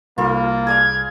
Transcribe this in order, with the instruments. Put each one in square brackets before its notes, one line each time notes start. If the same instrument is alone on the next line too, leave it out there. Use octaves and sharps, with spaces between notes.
[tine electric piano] C2 [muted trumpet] A#3 [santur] F4 A4 B5
[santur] G#4 D5 F5 [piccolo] G#6